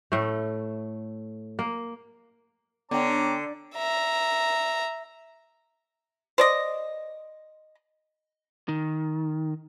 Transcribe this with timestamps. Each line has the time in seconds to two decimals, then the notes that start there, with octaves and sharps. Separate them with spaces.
0.12 A2 A3
1.59 A#3
2.91 D3 B3 C#4 G5 A#5 D6
3.75 E5 A#5
6.38 C5 D5 D#5
8.68 D#3